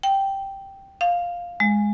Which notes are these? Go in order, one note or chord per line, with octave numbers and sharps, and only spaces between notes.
G5
F5
G#3